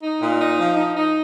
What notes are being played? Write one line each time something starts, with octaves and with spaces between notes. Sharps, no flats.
D#4
A#2
D#4
F3
D#4
D#4